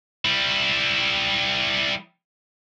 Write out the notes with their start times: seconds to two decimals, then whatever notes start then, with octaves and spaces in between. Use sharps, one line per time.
0.25 G3 E4